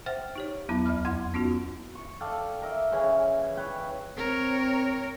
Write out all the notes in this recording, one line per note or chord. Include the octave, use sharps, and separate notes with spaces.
C5 E5 F#5 G5 F6 A6
D#4 G4 C#5
E2 F#3 B3 E4 A#5 B5
D2 E5 B5 F6
F2 E4 F#5 C6 G#6
B3 C#4 D#4 F4 F#4
C#6
A4 D5 F5 G5
A#4 D#5 E5
C#3 E3 C#4
B4 C#5 G5
C4 A#4 C#5